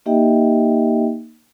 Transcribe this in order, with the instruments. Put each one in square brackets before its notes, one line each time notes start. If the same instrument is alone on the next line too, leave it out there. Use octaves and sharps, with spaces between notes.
[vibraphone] A#3 D#4 G4 D#5 E5 G5